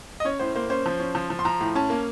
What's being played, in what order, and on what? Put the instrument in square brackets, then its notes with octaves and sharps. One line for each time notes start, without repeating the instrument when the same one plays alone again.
[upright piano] D#5
C#4 C#5
A2 C5
A#3 C5
C#4 C5
F3
C#4
F3
F3
C6
F3 A#5
A2
C#4 A5
A#3